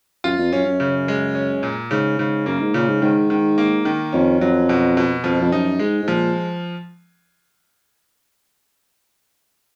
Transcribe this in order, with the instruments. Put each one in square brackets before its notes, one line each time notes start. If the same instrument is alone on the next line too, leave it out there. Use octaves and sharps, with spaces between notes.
[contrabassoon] F#2 [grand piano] F4
[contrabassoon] F2
[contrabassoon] F#2 [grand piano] C#4
[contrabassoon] F#2
[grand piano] C#3
G#3
C#4
A#2
[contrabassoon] G#2 [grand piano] C#3
[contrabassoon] G#2 [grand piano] C#3
[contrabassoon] F#2 [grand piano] A#3
[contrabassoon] G#2
[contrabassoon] A#2 [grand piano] C#3
[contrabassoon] G#2
[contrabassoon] G#2 [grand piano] D#3
[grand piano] D#3
A#3
D#3
[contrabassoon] F2 [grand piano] C#4
[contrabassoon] F2 [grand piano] F#3
[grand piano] B2
B2
[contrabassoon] F2 [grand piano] F3
[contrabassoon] F2
[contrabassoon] F#2 [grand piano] D#4
[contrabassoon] G#2 [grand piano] G#3
[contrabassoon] G#2
[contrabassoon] A#2 [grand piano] F3